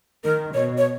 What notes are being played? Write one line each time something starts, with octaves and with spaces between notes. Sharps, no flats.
D#3 A#4
B2 C#5
C#5